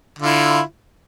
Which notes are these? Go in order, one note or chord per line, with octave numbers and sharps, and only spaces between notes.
D3 E4 F4